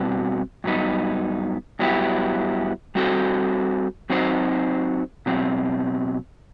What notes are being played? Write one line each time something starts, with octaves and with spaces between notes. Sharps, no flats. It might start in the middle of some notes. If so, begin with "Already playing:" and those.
Already playing: B2 G3 C4 F#4 B4
G2 F#3 B3 D#4
G2 F#3 B3 E4 G4
G3 C4 F#4 A4 C5
F#3 C4 D#4 F#4 C5
B2 F#3 C4